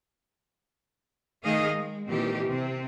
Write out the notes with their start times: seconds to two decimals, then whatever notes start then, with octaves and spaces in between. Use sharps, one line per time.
1.44 D#3 A3 D#4 G#4 D#5 F5
1.74 G#3
2.06 A#2 D#3 E3 C4 G4
2.44 C3 C4